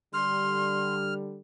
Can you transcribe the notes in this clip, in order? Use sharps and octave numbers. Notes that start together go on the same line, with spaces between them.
D3 G3 C6 F6